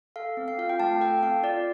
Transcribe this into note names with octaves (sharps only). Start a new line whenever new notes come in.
A4 F5
C4
F5
F4 F5
G5
A3 A5
A4 G5
C4 F5
F4 D5